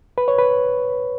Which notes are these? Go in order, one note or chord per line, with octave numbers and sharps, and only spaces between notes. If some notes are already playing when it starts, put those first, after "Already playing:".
B4
C#5
B4